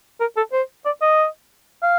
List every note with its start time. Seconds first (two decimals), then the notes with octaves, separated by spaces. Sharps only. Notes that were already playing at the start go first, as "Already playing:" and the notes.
0.20 A#4
0.37 A4
0.52 C5
0.86 D5
1.02 D#5
1.83 F5